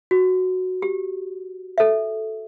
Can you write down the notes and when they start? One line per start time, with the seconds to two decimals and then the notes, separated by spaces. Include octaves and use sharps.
0.11 F#4
0.82 G4
1.78 A4 E5